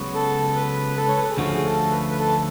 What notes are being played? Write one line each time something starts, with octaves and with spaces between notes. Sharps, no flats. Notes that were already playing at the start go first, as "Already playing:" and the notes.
Already playing: C#2 C#3 F#3 B3 F#4
A4
B4
A4
C#5
B4
A4
G#4
D2 D3 F3 A3 C#4 F#4
G#4
A4
B4
B4
A4